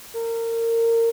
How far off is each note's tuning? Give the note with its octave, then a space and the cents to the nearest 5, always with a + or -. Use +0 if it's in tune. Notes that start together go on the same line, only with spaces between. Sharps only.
A#4 -25